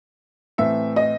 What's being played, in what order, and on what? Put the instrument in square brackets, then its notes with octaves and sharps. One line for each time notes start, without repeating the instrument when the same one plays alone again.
[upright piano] A2 E3 C4 E5
D#5